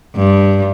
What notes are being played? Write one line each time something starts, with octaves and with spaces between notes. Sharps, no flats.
G2